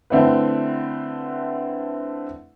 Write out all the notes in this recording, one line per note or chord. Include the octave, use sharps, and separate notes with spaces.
D3 A3 C4 E4 B4